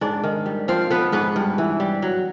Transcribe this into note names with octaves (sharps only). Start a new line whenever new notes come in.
G#2 D4 D5
D#3
G3
F3 C4 C5
F3 B3 B4
G#2 B3 B4
G2
E3
G3
F#3